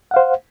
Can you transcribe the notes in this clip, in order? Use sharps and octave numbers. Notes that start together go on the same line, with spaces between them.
C5 F5 F#5